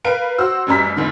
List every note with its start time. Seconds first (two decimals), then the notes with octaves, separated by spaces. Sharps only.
0.04 A#4 B4 F5 D7
0.38 F#4 C5 E6
0.67 A1 F#2 G3 A#5 B6
0.96 F1 G#2 D3